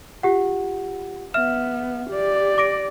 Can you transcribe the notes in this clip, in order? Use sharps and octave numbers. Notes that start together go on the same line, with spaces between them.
F4 G4 F#5
B3 E5 F6 E7
G4 D5
D6 A#6 D7